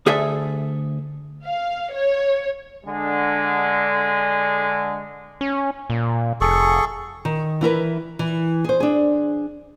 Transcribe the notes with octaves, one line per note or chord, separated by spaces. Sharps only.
D2 G#4 A4 E5
F5
C#5
D3 G#3
C#4
A#2
F1 G#4 A4 C#6
D#3
E3 E4 A#4 B4
E3
G#4 C5
D4 G#4